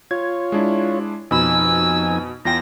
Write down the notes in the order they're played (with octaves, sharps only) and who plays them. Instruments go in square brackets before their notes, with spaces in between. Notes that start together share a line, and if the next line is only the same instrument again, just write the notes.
[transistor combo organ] F4 C#5 [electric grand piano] G#6
[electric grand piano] G#3 D4 E4
[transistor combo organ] F2 D#4 G#5 [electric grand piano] B2 B5 [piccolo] E6
[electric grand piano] E2 F4 G5 [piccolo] A#6